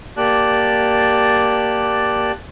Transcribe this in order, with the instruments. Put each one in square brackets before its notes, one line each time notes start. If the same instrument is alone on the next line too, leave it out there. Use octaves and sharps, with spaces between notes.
[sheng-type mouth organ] A#3 G4 D5 A5 F#6